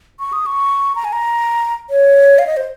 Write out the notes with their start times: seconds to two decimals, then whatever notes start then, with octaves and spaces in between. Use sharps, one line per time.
0.19 C#6
0.33 D#6
0.46 C#6
0.95 A#5
1.04 G#5
1.13 A#5
1.90 C#5
2.39 F5
2.47 D#5
2.57 C5